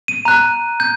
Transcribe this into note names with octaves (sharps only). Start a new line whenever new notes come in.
D#7
A#5 F#6
G6